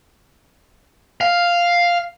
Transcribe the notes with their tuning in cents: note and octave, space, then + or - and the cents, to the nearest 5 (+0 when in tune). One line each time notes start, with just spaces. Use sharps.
F5 +0